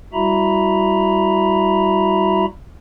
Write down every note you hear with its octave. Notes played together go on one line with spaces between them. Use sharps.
G3 E4 F#4 E5 A#5 B5